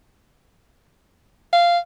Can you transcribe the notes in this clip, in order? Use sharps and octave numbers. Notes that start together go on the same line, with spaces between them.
F5